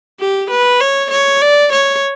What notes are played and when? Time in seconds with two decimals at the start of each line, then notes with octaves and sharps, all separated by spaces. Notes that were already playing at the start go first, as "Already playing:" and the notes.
0.20 G4
0.51 B4
0.81 C#5
1.11 C#5
1.42 D5
1.73 C#5